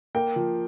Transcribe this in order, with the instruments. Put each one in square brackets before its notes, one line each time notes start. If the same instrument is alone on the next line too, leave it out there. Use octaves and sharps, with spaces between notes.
[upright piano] A#3 G5
F3